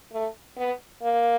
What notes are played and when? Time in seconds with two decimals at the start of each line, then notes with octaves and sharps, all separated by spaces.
0.13 A3
0.57 B3
1.02 A#3